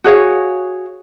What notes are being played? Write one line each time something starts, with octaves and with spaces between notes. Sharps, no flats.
F#4 G#4 C#5 F5